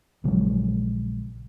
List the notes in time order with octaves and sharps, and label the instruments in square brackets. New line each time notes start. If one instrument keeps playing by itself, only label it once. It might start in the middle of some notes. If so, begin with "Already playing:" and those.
[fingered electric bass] A#1 C#3 F#3 G#3